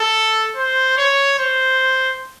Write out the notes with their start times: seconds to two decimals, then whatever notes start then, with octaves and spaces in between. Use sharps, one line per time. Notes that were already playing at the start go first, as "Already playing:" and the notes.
Already playing: A4
0.56 C5
0.97 C#5
1.38 C5